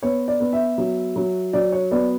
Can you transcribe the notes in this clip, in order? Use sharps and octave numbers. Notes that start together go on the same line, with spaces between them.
B3 C#5
D5
B3
E5
F#3
F#3
F#3 D5
C#5
B3 D5